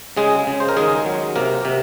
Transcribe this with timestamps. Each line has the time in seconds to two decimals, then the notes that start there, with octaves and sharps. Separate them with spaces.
0.17 C#3 G#3 G#4
0.47 C#3
0.60 C5
0.69 A#4
0.77 D#3 G#3 G#4
1.06 F#3
1.36 C3 A#3 A#4
1.65 C3